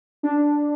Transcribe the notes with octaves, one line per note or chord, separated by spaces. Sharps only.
D4